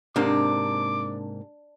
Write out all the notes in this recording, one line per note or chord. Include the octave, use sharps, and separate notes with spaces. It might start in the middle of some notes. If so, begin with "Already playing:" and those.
G#2 C3 A#3 D4 D6